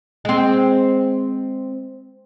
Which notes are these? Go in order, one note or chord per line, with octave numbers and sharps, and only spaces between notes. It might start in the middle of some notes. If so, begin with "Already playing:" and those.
G#3 C4